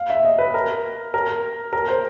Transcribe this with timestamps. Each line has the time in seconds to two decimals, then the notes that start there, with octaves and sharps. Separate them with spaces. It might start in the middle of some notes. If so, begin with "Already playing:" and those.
Already playing: F5
0.10 E5
0.25 D#5
0.39 B4
0.54 A#4
1.14 A#4
1.73 A#4
1.88 C5